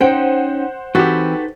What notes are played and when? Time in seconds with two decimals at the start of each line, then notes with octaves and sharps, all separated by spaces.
0.01 C#4 D#4 C5 F#5 G5
0.95 E3 C4 D#4 F#4 G4 A4 B4